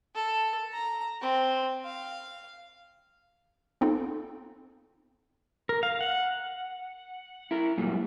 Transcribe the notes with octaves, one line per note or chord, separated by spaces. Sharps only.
A4
A#5
C4
F5
B3 C4 D#4 F4 A4
A#4
F5
F#5
E4 A#4
F#2 A#2 G3